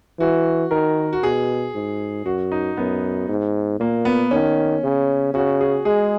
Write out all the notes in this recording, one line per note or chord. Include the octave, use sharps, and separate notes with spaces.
E3 F#4
D#3 A#4
F#4
B2 G#4
G#2
F#2 F#4
D#4
F#2 B3
G#2
A#2 A#3
B3
D#3 C#4
C#3
C#3 F#4
G#4
G#3 G#4